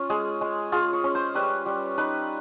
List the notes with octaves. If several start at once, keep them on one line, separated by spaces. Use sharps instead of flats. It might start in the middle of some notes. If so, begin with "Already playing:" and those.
Already playing: C#4 F4
G#3 G#4
G#3
F4 G#4
C#5
C#4
C5
G3 B4
G3
D#4 B4